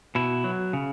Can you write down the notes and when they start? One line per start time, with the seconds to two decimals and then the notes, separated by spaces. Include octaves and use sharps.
0.15 B2 E4
0.44 F#3
0.73 C#3